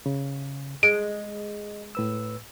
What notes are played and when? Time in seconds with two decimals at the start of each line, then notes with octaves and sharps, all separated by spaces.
0.06 C#3
0.83 G#3 D#5 D7
1.95 A2 B4 E6